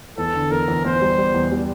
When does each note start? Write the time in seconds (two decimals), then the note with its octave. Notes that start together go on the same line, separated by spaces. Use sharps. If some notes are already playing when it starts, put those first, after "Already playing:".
0.18 E2 A4
0.34 D3
0.51 E2 A#4
0.68 E2
0.85 E2 C5
1.02 G3
1.18 G3
1.34 E2
1.52 G3